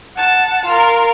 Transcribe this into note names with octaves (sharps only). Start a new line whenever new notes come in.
F#5 A5
F4 A#4